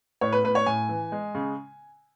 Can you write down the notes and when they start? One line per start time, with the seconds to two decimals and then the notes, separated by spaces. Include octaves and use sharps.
0.21 A2 C#5
0.33 B4
0.44 A2 B4
0.55 C#5
0.66 A2 G#5
0.89 E3
1.12 G#3
1.35 C#3